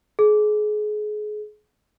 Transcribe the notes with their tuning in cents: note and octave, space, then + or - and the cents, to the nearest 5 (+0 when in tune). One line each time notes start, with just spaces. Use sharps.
G#4 +30